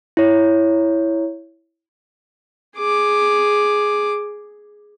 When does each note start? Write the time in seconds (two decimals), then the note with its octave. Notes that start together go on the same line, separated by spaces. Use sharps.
0.17 E4 C#5
2.77 G#4 D6